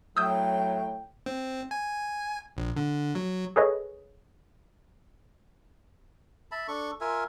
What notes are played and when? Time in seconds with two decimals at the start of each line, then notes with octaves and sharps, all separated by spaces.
0.17 A2 F#3 G5 D#6 E6 G6
1.26 C4
1.71 G#5
2.57 A#1
2.76 D3
3.15 F#3
3.56 G#4 A4 B4 C#5 D#5
6.51 E5 A5 B5
6.68 D4 A4 C#6
7.01 F4 A#4 E5 G#5